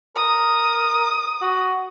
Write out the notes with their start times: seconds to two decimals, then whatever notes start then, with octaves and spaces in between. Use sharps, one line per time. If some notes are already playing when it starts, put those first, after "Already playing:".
0.16 A#4 D#6
1.42 F#4